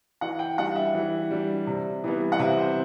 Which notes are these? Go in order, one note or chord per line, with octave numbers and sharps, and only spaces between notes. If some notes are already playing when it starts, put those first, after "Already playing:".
E3 F#5
G5
G3 D4 F#5
E5
E3
G3 D4
C3
E3 G3 B3
F#5
C3 E5
C5